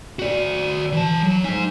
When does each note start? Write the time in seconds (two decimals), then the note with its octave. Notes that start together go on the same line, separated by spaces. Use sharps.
0.19 F#4 D5
0.92 E3 A5
1.23 F#3
1.44 D#4 G#5